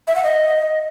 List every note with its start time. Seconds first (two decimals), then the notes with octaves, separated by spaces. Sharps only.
0.08 E5
0.16 F#5
0.24 D#5